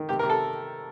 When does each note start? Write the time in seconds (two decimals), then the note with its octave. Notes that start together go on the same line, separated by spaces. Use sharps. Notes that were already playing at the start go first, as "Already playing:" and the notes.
Already playing: D#3
0.09 C3 G4
0.19 A#4
0.23 C3
0.30 A4